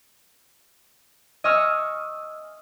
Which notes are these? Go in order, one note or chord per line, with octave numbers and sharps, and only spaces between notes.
D#5 G#5 C#6 E6 F6